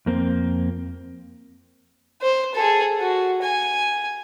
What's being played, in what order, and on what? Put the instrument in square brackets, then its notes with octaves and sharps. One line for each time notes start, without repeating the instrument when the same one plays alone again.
[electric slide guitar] F2 A#3 C4
[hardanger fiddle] C5
G#4 A4
F#4
G#5